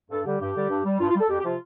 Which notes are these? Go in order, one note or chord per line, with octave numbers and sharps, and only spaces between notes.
G2 A4
D3 G3 G4
G2 G4
D3 G3
G2
G3
G2 F4
F4
G3
A4
F2 G4
G4
C3 F3 F4